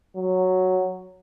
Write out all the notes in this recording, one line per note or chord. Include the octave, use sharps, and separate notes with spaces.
F#3